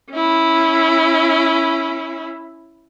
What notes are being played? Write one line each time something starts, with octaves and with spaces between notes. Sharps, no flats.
C#4 E4